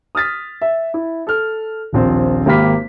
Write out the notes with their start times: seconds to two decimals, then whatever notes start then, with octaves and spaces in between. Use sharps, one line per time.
0.15 D#6 F6 A6 B6
0.62 E5
0.94 E4
1.27 A4 F6
1.93 D#1 A#1 C4
2.46 G#1 A#3 G4 B5 F6 B6